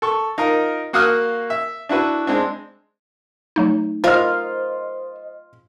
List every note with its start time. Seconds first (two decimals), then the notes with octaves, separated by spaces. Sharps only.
0.02 A4 C#6
0.38 D#4 F4 A#4
0.93 A#3 F#4 F5 D#6 F6 F#6
1.50 E5
1.89 D4 E4 F#4 B4
2.27 G#3 C4 D4
3.56 F#3 A3 D#4
4.04 F4 A#4 C5 D#5 F5 F6